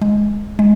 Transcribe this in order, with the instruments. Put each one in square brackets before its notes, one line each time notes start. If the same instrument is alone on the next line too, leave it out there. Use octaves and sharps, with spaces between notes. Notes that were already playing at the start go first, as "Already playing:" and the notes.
[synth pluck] G#3
G#3